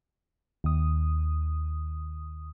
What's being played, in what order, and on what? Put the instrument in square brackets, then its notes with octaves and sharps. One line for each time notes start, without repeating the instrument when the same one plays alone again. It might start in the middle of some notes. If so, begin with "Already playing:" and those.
[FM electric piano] D#2 D#6